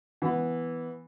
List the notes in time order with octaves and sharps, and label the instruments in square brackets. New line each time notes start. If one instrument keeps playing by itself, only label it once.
[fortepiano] E3 B3